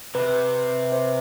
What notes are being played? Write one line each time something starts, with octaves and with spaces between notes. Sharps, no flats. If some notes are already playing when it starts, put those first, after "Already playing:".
C3 B4
C5